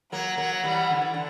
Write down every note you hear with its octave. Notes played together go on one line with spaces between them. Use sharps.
F#3 A#3 F#5
F#3 A#3
E3 G3
D3
E3
D3